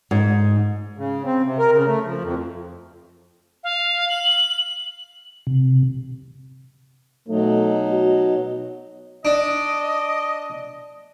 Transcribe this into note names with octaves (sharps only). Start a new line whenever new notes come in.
G#2
C#3
C4
C3
A#4
C#3
A3
F3
F2
F5
F#7
C3
B2 F#3 A3 D#4
F#4
D4 D#5